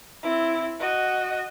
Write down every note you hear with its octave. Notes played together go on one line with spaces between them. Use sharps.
C4 E4
F#4 D#5